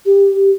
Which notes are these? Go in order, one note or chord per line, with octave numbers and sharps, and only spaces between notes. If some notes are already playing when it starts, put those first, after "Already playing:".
G4